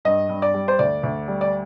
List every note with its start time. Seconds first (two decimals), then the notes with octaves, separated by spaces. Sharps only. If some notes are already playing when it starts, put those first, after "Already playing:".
0.05 G2 D#5
0.29 G2
0.42 D5
0.54 G3
0.68 C5
0.79 D2 D5
1.03 D2
1.28 G3
1.41 D5